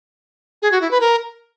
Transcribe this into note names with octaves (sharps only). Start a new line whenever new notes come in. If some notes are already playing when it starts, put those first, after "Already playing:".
G#4
F#4
E4
B4
A#4